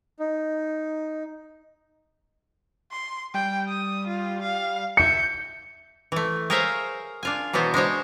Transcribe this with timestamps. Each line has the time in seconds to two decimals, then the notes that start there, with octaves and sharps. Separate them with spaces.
0.20 D#4
2.91 C6
3.34 G3 G5
3.68 D#6
4.07 F4
4.42 F5
4.97 E5 G6 C#7
6.12 E3 A3
6.50 G#4 A#4 C5 C#5 E5 F5
7.23 D4 F4 G#5
7.53 B2 E3 F#3 B3 C5
7.74 G#3 D4 C5 C#5